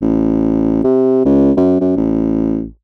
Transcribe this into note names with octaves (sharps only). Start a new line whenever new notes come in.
A1
C3
C#2
F#2
F#2
A1